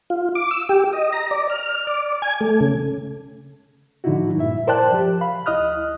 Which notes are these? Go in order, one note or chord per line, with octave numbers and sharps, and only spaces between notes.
F4
D6
E6
G4
D#5
A#5
D5
F6
D5
G#5
A3
C#3
A2 D3 F3 D#4 E4 F#4
G2 A#2 E4 E5
A#4 C5 D5 G5 A5 F#6
F3 G4
F5 B5
D2 E4 D#5 D#6 F6 F#6